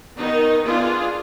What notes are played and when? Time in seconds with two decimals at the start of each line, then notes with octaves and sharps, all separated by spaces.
0.16 D#3 B3 D#4
0.63 B3 D4 F4 G#4